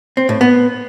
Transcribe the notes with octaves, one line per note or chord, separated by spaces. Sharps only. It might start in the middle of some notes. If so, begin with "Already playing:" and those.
C4
A2
B3